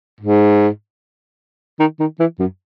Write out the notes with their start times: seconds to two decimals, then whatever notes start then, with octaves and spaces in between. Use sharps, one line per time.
0.21 G#2
1.80 D#3
2.00 D#3
2.20 E3
2.39 F#2